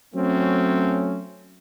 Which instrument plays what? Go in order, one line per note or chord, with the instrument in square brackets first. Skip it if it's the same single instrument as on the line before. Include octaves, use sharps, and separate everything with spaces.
[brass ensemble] F#3 A3 C4 C#4